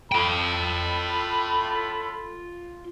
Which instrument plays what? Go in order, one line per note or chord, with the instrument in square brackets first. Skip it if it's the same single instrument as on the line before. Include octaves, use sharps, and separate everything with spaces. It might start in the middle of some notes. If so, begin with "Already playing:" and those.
[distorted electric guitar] F4 G5 [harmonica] A4 B5